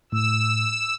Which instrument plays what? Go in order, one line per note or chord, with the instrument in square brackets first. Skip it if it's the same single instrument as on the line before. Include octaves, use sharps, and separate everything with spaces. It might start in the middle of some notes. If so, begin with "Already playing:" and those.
[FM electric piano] A2 [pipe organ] E6